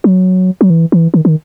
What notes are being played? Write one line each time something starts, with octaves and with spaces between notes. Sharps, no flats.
F#3
F#3
E3
E3
D#3
D#3